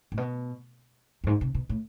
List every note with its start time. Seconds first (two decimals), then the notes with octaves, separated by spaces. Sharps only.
0.12 A2
0.17 B2
1.24 F2
1.27 G#2
1.41 C3
1.54 B2
1.69 A2